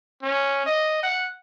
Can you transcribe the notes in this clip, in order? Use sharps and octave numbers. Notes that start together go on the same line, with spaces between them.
C#4
D#5
F#5